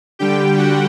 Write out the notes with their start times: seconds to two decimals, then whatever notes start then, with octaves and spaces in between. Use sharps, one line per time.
0.19 D3 G3 G4 G5
0.58 F#4 F#5